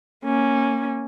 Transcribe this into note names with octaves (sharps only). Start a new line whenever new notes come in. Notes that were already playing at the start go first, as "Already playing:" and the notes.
A#3 C#4